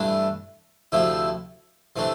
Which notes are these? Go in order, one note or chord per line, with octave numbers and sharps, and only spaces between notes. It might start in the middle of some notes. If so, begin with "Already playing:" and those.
Already playing: G2 E3 A3 D4
D2 C3 F3 A3 E4
C3 E3 A3 D4